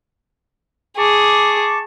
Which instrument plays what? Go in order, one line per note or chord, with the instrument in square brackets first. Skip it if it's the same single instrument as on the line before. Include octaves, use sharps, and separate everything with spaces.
[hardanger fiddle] G#4 [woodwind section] A5 C#6 D6